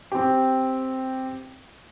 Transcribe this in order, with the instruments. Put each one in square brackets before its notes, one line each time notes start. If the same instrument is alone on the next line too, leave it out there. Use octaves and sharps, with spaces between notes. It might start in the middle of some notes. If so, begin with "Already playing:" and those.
[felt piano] C4 G4